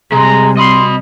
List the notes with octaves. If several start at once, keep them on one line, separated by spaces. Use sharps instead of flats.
C3 G3 G#3 A#5
D#5 B5 C6